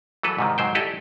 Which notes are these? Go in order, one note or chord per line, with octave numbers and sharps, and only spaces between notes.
E3 F#3 A4 B4
G#2 C3 D#3
G#2 F#3 C5 G5
E4 G4 A4 D5 D#5